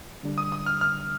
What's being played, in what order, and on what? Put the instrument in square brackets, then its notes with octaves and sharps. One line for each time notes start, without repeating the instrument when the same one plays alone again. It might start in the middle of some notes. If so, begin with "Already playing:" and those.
[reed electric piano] D3 G3 D4
[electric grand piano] D#6
D#6
F6
F6